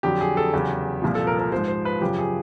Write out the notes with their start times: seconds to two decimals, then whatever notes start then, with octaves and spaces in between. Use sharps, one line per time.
0.03 F2 D3 F#3 G4
0.21 G#4
0.37 A4
0.53 E2 C#3 F#3 G4
1.02 C2 A#2 F3
1.15 A4
1.27 A#4
1.39 A#4
1.52 G#2 F3 C5
1.68 C5
1.85 B4
2.01 F#2 C#3 F3 G4
2.18 G#4